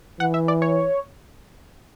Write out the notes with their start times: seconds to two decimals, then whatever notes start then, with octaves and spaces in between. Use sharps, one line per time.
0.20 E3 F#5
0.34 E5
0.48 D5
0.62 C#5